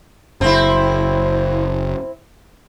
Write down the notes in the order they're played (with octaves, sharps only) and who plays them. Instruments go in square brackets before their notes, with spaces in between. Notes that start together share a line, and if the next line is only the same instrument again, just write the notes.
[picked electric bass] F#1 [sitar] C4 E4